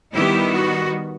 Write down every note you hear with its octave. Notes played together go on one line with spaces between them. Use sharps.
D#3 G3 B3 E4 G4
F#4